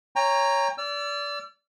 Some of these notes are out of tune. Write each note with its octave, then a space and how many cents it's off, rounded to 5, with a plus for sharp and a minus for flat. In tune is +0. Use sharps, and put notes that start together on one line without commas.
C#5 +0 G5 +40 A#5 +0
D5 -25 E6 +40